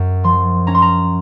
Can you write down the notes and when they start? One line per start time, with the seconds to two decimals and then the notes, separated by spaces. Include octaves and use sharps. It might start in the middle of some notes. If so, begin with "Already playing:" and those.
Already playing: F#2
0.24 F3 C6
0.67 C#4 A#5
0.75 C6
0.82 A#5